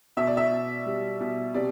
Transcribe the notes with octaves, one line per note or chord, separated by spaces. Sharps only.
B2 E5
D5
E5
B2
G3
B2
C3 D5